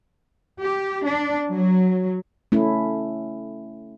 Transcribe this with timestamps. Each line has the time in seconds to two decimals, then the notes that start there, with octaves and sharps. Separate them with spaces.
0.60 G4
1.04 D4
1.52 F#3
2.52 A3 C#4 E4